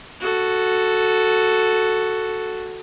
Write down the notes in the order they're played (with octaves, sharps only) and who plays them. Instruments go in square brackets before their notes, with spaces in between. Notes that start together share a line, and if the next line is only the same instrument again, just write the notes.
[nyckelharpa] F#4 A4